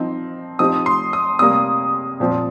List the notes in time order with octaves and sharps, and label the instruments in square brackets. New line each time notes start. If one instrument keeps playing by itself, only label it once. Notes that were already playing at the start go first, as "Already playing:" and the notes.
Already playing: [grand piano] F3 C4 D#4
[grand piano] F3 C4 D#4 G4 [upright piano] D#6
[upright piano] C6
D#6
[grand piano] C3 G3 A#3 [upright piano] D#6
[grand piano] A#2 F3 C4